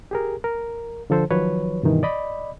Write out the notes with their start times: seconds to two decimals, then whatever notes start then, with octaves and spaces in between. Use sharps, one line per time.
0.11 G4 G#4 A#4
0.44 A#4
1.10 D3 F3 A4 C5
1.31 D#3 F3 F#3 B4 C#5
1.83 G2 B2 D#3 E3
2.03 D5 D#5 B5